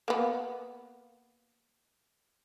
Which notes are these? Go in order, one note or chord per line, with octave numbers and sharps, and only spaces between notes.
A#3 B3